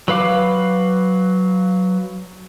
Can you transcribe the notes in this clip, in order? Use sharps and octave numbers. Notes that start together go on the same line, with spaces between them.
F#3 B4 F5 D6